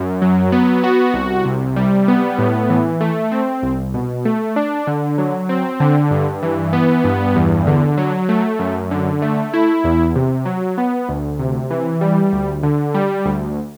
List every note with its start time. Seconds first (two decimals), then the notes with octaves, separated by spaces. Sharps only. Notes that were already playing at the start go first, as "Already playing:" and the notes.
Already playing: F#2
0.22 F#3
0.52 B3
0.84 F#4
1.14 C2
1.45 C3
1.76 G3
2.08 B3
2.39 A2
2.70 E3
3.01 A3
3.32 C4
3.63 C2
3.94 B2
4.25 A3
4.56 D4
4.87 D3
5.18 F#3
5.49 C4
5.80 D3
6.11 G2
6.43 E3
6.73 B3
7.04 G2
7.36 E2
7.67 D3
7.97 F#3
8.29 A3
8.59 F#2
8.91 D3
9.22 A3
9.53 E4
9.84 E2
10.15 C3
10.45 F#3
10.78 B3
11.09 D2
11.39 C3
11.71 E3
12.01 G3
12.33 D2
12.63 D3
12.94 G3
13.25 D2